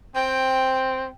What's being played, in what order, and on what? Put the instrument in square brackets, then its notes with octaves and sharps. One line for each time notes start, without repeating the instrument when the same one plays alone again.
[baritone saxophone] C4 [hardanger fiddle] G5